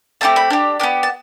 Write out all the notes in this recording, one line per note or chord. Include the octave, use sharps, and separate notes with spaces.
A3 C4 E4 G4 A5
B5
D4 G4
B3 D4 G4
A5